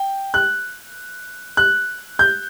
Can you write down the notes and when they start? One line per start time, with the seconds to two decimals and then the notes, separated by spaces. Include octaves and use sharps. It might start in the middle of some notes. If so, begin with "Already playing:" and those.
Already playing: G5
0.34 F#6
1.57 F#6
2.19 G6